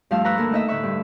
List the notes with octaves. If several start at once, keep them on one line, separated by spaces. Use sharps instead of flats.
G2 F3 A3 F5 A5 E6
B4 A#5 B5 C#6 E6 F#6
D2 A#3 A4 A#4
A3 D#4 D#5 E5
A2 D3 B4 E5 C#6
G2